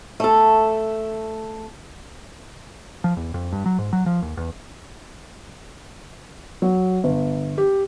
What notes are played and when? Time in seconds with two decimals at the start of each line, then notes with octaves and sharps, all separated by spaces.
0.20 A3 A4
3.04 F3
3.17 E2
3.34 F2
3.53 G2
3.66 F#3
3.79 G#2
3.93 F#3
4.06 F3
4.22 D#2
4.37 E2
6.62 F#3
7.04 G1
7.58 G4